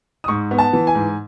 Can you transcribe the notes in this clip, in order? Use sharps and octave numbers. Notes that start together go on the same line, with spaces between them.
D#6
G#2 C#6
B3
A5
E3
G#5
G#2